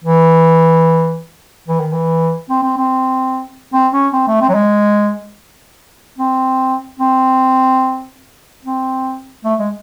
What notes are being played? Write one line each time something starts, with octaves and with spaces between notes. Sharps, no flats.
E3
E3
D#3
E3
C4
C4
C4
C4
C#4
C4
A3
C4
F#3
G#3
C4
C4
C4
A3
G#3